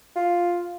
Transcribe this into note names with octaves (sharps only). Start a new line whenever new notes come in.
F4